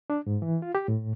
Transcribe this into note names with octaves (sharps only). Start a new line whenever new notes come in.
D4
G#2
E3
F4
G4
A2